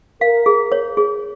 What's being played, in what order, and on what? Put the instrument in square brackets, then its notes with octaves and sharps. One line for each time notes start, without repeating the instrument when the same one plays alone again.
[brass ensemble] A#4 [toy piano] F5
[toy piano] G#4
C#5
G#4